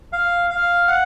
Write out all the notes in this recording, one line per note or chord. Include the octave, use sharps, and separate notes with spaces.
F5
F5
F#5